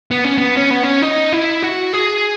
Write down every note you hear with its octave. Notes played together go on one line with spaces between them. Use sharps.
B3
C#4
B3
C#4
B3
C#4
D#4
E4
F#4
G#4